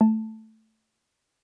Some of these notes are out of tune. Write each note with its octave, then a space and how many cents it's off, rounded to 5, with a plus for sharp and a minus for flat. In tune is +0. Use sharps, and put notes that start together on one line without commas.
A3 +0 A5 +5